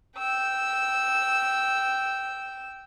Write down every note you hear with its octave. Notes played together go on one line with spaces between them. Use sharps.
G5 E6